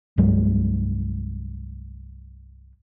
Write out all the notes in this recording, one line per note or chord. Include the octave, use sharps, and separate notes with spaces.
C2 G2 F#3 G#3